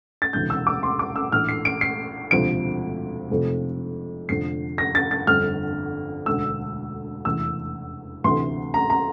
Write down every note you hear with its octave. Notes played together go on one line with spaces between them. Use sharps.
A6
E1 D2 C3 E3 G6
E6
D6
C6
D6
E6
A#1 A2 E3 F6
C7
D7
C7
E1 D2 C3 F3 D7
F1 F2 C3 F3
F1 F2 D3 F3 C7
A#6
A6
A6
G1 F2 D3 F6
E1 D2 D3 E6
F1 E2 E3 E6
D2 C3 E3 C6
A#5
A#5